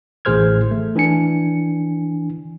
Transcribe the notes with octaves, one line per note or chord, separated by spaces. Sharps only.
A1 A2 G#4 C5 F6 G#6
A3
E3 D4 G#5 C#7